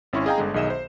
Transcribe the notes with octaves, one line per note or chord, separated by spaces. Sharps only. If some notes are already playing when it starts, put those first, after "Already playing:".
G#1 C#4 E4 C6 C#6
G#4 D#5 F5 G5 G#5 A#5
G1 D3 G#3
B1 D#3 G#4 D#5 E5 E7
C5